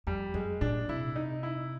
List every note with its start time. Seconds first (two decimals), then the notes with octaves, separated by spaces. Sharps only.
0.07 F2 G3
0.34 F#2 G#3
0.61 A#2 D4
0.89 C3 E4
1.16 D#4
1.43 E4